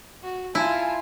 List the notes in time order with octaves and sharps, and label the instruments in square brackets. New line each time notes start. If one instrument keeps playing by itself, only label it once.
[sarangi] F#4
[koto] E4 [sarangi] F4 [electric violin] G#5 A5